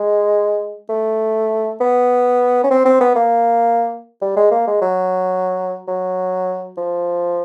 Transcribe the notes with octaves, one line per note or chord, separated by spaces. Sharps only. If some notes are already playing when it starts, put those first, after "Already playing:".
Already playing: G#3
A3
B3
C#4
C4
C4
B3
A#3
G3
G#3
A#3
G#3
F#3
F#3
F3